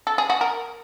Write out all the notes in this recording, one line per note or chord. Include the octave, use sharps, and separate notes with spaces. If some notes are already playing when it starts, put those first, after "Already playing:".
A4
G#4
F#4
A#4